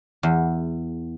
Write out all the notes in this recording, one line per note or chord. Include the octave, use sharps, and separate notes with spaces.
E2